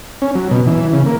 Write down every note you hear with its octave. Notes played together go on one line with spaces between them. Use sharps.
C#4
F#3
B2
E3
C#3
A#3